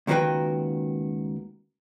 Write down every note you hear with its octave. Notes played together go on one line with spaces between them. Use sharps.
C#2 D#3 A#3 F#4 B4 G5